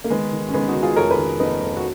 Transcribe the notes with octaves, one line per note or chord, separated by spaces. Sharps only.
A#3
D#3 G#3 B3
D#3
C#4
D#3 G#3 B3
D#4 F#4
D#3
F4 G#4
F1 A#4 C#5
G#4 B4
D#3
F1 B3 D#4
F1
F#4